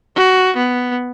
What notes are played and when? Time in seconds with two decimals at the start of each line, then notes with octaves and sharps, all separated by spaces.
0.16 F#4
0.57 B3